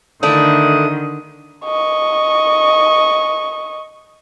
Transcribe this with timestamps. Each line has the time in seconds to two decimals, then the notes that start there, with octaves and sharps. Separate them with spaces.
0.23 D3 D#3 A3 D4 E4 D#6
1.65 D#5 C#6